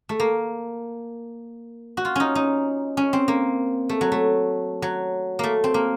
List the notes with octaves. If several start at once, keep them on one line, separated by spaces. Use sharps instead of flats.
A3
A#3
F#4
F4
C#4 D#4
D#4
C#4
C4
A#3
A3
F#3
A3
F#3
A3 A#3
C4
A#3